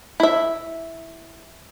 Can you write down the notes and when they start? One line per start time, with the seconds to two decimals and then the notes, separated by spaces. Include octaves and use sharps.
0.20 E4 E5